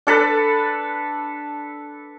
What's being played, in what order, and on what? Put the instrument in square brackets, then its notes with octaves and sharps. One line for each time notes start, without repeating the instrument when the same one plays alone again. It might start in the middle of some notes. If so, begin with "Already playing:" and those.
[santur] D4 A4 B4